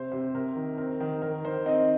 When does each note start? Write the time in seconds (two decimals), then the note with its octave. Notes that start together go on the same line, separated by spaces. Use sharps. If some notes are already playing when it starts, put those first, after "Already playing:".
Already playing: C3 C5
0.12 C3 C5
0.35 C3 A#4
0.56 D#3
0.78 C4 A#4
1.00 D#3
1.22 D#3 A#4
1.44 D#3 C5
1.65 C4 D#4 D#5